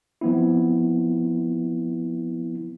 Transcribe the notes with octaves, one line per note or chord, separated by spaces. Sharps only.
F3 B3 C4 E4